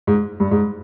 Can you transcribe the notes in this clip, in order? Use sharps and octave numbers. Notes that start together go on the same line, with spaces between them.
G#2
G2
G#2